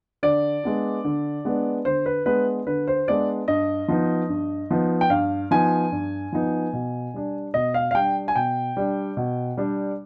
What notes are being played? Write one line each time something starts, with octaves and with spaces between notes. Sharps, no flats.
D3 D5
G#3 B3 D4
D3
G#3 B3 D4
D3 C5
B4
G#3 B3 D4 B4
D3 B4
C5
G#3 B3 D4 D5
G2 D#5
F3 B3 D#4
G2
F3 B3 D#4
G5
G2 F5
F3 B3 D#4 G#5
G2
F3 B3 D#4
B2
G3 D4
B2 D#5
F5
F5
G3 D4 G5
G#5
B2 G5
G3 D4
B2
G3 D4